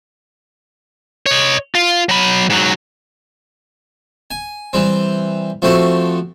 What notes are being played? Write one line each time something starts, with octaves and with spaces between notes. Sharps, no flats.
C#5 D#5
F4
F#3 B5
G#2 F#3
G#5
E3 G3 C4
F3 A3 C4 F#4 A4